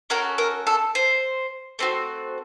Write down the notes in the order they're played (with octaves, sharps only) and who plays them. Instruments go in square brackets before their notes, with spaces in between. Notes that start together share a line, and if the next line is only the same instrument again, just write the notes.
[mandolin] C#4 F#4 A4 A#4
A#4
A4
C5
A3 C4 F#4